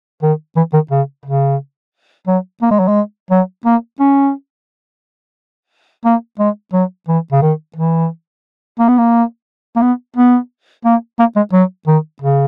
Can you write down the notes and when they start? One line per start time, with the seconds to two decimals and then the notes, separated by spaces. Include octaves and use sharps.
0.23 D#3
0.57 E3
0.74 D#3
0.91 C#3
1.25 C#3
2.27 F#3
2.62 A#3
2.71 G#3
2.80 F#3
2.88 G#3
3.31 F#3
3.65 A#3
4.00 C#4
6.05 A#3
6.39 G#3
6.73 F#3
7.08 E3
7.32 C#3
7.42 D#3
7.76 E3
8.79 A#3
8.88 B3
8.98 A#3
9.76 A#3
9.82 B3
10.16 B3
10.85 A#3
11.19 A#3
11.36 G#3
11.53 F#3
11.87 D#3
12.22 C#3